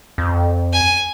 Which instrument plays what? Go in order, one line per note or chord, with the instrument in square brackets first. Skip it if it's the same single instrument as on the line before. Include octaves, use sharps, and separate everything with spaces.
[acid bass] F2
[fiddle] G#5